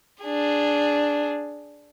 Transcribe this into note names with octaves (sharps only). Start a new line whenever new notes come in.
D4 G#4